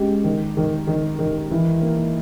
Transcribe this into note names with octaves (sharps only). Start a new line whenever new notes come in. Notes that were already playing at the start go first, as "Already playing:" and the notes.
Already playing: G#3 C#4 G4
D#3
D#3
D#3
D#3
E3
A#3